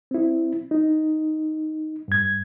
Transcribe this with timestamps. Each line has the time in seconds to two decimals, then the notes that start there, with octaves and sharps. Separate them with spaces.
0.11 C4 E4
0.71 D#4
2.08 G2 G#6